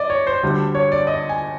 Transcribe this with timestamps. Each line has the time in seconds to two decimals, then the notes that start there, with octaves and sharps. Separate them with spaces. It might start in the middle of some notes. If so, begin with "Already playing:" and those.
Already playing: D5 D#5
0.10 C#5
0.27 C5
0.43 D2 D3 G3
0.75 C#5
0.92 D5
1.07 D#5
1.29 G#5